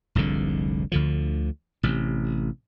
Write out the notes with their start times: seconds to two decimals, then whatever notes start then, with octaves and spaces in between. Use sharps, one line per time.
0.15 F1 C2 G#2 D3
0.92 D2 D3 F3
1.83 A1 C3